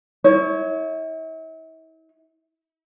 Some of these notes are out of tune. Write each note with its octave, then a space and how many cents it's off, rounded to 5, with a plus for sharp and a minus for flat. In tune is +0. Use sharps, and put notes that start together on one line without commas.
E4 -40 C#5 +0